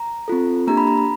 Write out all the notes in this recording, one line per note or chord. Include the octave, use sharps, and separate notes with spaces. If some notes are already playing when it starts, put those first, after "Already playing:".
Already playing: A#5
C4 F4 A4
A#3 D4 G4 A#5
B5
A#5
B5